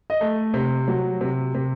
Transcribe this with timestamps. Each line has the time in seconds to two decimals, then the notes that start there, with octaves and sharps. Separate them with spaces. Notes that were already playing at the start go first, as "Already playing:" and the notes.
0.10 D#5
0.21 A3
0.54 C3
0.88 F#3
1.21 C3
1.54 C3